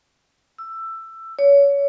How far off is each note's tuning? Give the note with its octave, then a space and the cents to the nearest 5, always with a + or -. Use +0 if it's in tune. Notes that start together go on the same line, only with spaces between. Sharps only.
E6 +15
C#5 +25